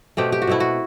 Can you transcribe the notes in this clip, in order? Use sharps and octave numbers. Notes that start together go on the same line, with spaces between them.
B2 A3 C4 G4
G4
F#4
B2 A3 C4 E4
F#4